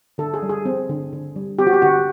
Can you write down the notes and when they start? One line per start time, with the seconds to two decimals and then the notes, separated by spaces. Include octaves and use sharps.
0.18 D3 A4
0.34 G#4
0.42 G3
0.49 G#4
0.65 C4
0.89 D3
1.13 D3
1.36 G3
1.59 C4 G4
1.67 F#4
1.73 G4
1.82 D3 F#4